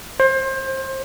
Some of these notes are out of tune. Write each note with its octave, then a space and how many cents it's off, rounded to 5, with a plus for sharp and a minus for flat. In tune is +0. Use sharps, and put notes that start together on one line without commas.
C5 +30